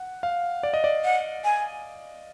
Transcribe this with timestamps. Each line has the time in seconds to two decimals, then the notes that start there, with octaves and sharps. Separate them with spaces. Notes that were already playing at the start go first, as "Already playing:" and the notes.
Already playing: F#5
0.23 F5
0.63 D5
0.74 D#5
0.84 D5
1.04 F#5
1.44 G#5